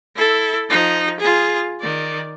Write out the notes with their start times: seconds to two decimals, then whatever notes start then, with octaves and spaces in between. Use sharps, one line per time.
0.16 E4 A4
0.69 F3 D#4
1.20 F4 G#4
1.80 D#3 D5